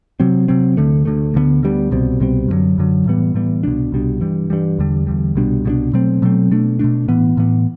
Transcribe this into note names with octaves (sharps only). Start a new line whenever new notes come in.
C3 F#3 C4
C3 F#3 C4
D2 D3 A3
D2 D3 A3
D2 D3 G3 B3
D2 D3 G3 B3
C2 B2 G3 C4
C2 B2 G3 C4
F#2 D3 F#3
F#2 D3 F#3
A2 E3 G3 B3
A2 E3 G3 B3
C2 B2 G3 D4
C2 B2 G3 D4
G2 E3 G3
G2 E3 G3
E2 D3 G3
E2 D3 G3
C2 B2 G3 D4
C2 B2 G3 D4
B2 F#3 A3 C4
B2 F#3 A3 C4
B2 A3 D4
B2 A3 D4
A2 E3 B3
A2 E3 B3